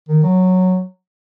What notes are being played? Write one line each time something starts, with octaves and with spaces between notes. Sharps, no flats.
D#3
F#3